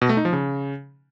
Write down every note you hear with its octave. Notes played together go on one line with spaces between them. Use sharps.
B2
A3
D#4
F3
C#3